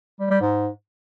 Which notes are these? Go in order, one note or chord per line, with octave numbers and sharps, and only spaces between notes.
G3
G3
G#2